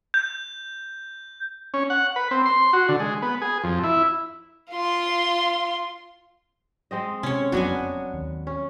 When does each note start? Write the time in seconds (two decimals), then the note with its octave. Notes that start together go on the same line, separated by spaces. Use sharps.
0.14 G6
1.74 C#4
1.90 F#5
2.16 B4
2.31 C4
2.46 C6
2.73 F#4
2.89 D3
3.00 G#3
3.22 B3
3.41 G#4
3.64 F2
3.84 E4
4.72 F4 C6
6.91 G#3 C4 D#5
7.23 C3 C#4 C#5
7.52 F#1 F2 F#3 B3 D4 F#4 F#5 G#5
8.14 D#2
8.47 C#4